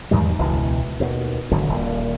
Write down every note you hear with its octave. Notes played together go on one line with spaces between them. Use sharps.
E2 G#2 D#3 G3
E1 C#2 B2 E3
D#2 B2
G#1 D3 F#3
D#1 A#2